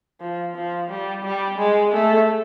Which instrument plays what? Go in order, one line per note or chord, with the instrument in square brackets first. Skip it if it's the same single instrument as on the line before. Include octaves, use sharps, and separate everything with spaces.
[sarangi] F3
F3
G3
G3
G#3
A3